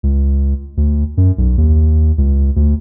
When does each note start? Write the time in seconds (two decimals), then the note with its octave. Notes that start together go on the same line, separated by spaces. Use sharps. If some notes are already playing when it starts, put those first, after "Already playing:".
0.03 C#2
0.77 D2
1.17 F#2
1.38 B1
1.58 D#2
2.18 C#2
2.56 D2